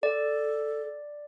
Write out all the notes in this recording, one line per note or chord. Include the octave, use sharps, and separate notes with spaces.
A4 D5